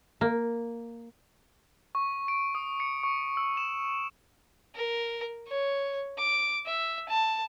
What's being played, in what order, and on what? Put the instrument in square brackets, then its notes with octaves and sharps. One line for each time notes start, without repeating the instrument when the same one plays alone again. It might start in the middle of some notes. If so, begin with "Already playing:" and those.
[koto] A#3
[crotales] C#6
D7
D#6
C#7
C#6
E6
E7
[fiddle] A#4
C#5
D6
E5
A5